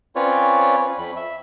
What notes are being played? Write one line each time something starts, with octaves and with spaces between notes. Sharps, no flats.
C4 C#4 F4 B4 C#5 D5
F2 B5
E5